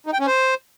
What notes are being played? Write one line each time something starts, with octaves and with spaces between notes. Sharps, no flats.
D#4
G5
C#4
C5